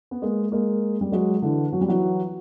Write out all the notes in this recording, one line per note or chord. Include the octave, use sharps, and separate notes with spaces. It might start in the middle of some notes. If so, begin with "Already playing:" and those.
B3
G#3 A#3
G#3 A#3
G3
F#3 G#3
D3 E3
F#3
G3
E3 F#3